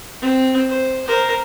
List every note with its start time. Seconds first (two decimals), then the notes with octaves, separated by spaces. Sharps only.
0.21 C4
0.70 C5
1.07 A#4 C5